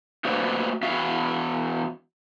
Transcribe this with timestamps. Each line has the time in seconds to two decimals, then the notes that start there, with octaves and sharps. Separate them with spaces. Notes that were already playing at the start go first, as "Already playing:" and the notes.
0.25 A3 A#3 F#4 B4 C5 D5
0.83 E2 F#4 E5 F5